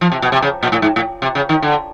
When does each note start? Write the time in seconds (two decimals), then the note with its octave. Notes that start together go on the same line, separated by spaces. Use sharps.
0.01 F3
0.12 C3
0.22 B2
0.32 C3
0.42 C#3
0.63 A#2
0.72 A2
0.82 G#2
0.96 A2
1.22 C3
1.35 C#3
1.49 D#3
1.62 D3